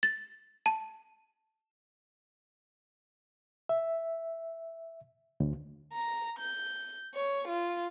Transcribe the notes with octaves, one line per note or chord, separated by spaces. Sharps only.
A6
A5
E5
D2
A#5
G6
C#5
F4